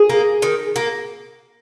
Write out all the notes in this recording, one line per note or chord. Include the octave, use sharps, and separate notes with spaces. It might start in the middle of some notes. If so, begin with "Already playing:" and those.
Already playing: G#4
A#3
D#3
A#3